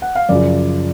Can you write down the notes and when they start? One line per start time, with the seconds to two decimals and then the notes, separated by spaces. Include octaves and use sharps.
0.02 F#5
0.15 F5
0.29 F#2 C#3 F3 D5